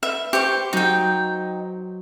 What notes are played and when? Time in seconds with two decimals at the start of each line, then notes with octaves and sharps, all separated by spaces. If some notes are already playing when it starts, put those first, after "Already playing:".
0.03 B4 E5
0.33 G4 C5 C#6
0.73 F#3 D#4 G5